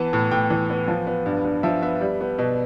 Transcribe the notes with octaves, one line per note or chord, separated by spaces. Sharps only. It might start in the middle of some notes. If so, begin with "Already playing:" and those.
Already playing: E3 B3 A5
A2
A2 G5
E3
B3
F3
B3
G2
G2
F3 E5
B3 E5
G3
B3
B2